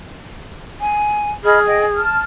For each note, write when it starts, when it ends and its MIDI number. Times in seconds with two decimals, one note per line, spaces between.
0.81 1.31 80
1.44 1.98 68
1.44 1.58 75
1.44 1.58 83
1.44 1.58 89
1.66 1.84 75
1.66 1.84 79
1.66 1.84 80
1.96 2.22 81
1.96 2.22 89